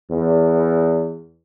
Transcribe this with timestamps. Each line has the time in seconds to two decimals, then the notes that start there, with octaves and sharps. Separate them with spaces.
0.11 E2